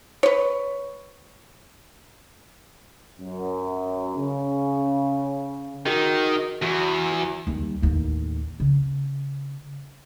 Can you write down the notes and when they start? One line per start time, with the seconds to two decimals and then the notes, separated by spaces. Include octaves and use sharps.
0.23 B4 C#5
3.19 F#2
4.17 C#3
5.86 D#3 F#4 G#4 A#4
6.62 E2 F#4 C#6
7.12 F#4
7.47 D#2 G3
7.82 A1 D#2
8.60 C#3